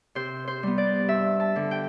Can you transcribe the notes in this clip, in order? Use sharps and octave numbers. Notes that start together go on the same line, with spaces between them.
C3 C5
C5
G3 B3
D5
G2 E5
A5
D3 G3
G5